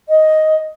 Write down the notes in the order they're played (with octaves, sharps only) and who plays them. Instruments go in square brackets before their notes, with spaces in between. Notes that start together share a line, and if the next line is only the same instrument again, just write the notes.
[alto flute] D#5